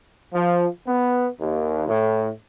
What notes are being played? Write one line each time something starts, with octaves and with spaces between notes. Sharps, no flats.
F3
B3
D#2
A2